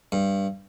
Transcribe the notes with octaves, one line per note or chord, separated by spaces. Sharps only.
G2